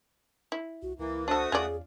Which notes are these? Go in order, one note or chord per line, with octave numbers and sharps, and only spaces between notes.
E4
C2 F#4
C#2 E3 A#3 E4
A3 D4 F#4 A4 C5 D#6
E2 C#4 F4 G#4 D5